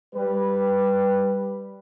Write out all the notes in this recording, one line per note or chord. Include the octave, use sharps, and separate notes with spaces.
G3 B4